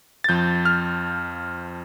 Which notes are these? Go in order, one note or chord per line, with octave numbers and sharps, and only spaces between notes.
A6
F2 F3 G6
F6